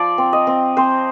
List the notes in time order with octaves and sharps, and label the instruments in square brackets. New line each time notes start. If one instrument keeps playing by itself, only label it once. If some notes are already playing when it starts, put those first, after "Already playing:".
Already playing: [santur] F3 D5
C4
D#5
C4
C4 C5